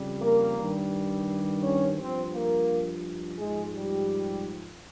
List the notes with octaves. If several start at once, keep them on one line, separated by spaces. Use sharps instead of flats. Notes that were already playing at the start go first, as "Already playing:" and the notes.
Already playing: F2 C#3 G3
A#3 A#4
G2 D#3 G3
C#4 C#5
G2 F3 C4 C5
A#3 A#4
G#2 F3 G#3 G#4
G3 G4